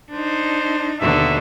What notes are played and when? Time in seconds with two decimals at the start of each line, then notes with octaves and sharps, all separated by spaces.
0.12 D4 D#4 C5
1.01 D#2 B2 D3 E5